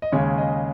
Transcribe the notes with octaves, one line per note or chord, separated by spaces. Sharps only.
D#5
D#2 C#3 G#3 C#5
D#5